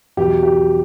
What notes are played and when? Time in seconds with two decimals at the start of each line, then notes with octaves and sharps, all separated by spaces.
0.17 E2 B2 F#3 G4
0.43 G4